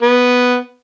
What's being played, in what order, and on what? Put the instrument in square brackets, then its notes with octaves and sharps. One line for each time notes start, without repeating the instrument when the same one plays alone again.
[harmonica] B3